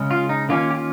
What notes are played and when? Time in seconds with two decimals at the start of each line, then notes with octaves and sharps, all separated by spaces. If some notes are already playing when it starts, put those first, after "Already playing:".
Already playing: C#3 G#3 C#4
0.11 F4
0.29 D#4
0.49 D#3 A#3 C#4 F4
0.71 G4
0.75 F4